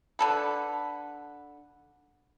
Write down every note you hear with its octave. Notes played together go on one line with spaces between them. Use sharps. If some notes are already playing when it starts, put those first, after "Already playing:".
D3 A4 B4